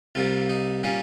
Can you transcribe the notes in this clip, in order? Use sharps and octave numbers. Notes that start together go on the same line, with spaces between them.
C2 C3 G3 A#3 F4
D#4
A#2 G3 A#3 C#4